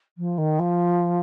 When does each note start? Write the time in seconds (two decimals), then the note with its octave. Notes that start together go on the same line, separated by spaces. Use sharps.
0.18 F3
0.38 D#3
0.59 F3